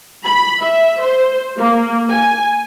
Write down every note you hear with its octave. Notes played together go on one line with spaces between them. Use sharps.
B5
E5
C5
A#3
G#5